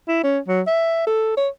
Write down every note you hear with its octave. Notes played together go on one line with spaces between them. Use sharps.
E4
C#4
F#3
E5
A4
C#5